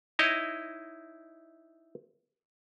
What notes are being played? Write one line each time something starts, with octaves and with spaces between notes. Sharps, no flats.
D#4 E4 C#5 D#5